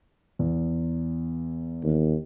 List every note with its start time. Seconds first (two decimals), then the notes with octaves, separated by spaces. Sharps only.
0.39 E2
1.82 D#2